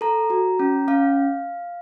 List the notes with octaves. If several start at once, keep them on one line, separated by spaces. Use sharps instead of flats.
A4 A#5
F#4
C#4
C#4 F5